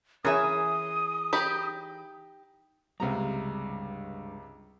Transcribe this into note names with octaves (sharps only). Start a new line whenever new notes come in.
E3 C#4 G#4 A#4 E5 D#6
D#4 G4 B5
C#2 G2 C3 G3 G#3 A#5